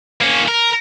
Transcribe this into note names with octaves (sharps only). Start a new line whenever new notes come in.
A#3 C#4
A#4